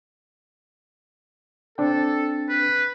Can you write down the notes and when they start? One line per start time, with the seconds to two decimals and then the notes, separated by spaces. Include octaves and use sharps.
1.78 C4 D4 A4 G5
2.49 B4